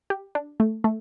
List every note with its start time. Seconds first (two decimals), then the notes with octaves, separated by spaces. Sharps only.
0.10 G4
0.35 D4
0.60 A3
0.84 A3